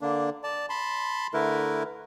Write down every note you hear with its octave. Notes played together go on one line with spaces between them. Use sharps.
D3 A#3 D4
D5 A5
A5 B5 C6
D3 A3 E4 A#4 B4